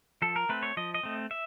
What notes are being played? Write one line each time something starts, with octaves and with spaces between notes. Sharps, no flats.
F3 A4
A#4
A3 C4 B4
C#5
F3 D#5
D#5
A3 C4
E5